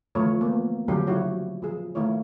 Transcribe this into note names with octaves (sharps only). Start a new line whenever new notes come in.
D3 E3 F3 A3 C#5
A#3 B3
D3 F3 F#3 C#4 D4 G4
C#3 F#3 D4 E4 F#4 C#5
F3 G#4
D#3 A3 E4 F4 C#5